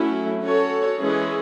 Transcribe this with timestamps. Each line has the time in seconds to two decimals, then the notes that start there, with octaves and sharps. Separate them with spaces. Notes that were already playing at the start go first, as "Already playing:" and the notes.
Already playing: F#3 A3 C#4 E4
0.41 C#4 F#4 A4 C#5
0.99 E3 G#3 C#4 E4 G#4